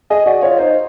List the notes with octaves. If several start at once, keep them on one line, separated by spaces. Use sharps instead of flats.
G#4 D#5
F#4 D5
F4 C#5
D#4 C5